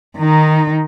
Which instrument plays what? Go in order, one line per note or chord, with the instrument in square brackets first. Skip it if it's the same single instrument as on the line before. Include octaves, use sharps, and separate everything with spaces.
[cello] D#3 D#4